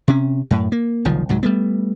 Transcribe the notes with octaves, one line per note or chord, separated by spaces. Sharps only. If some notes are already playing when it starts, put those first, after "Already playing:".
C3 C#4
F#2 A2
A#3
F#1 C2 D#3 F3
C2 G#2 F#3
G3 A3 B3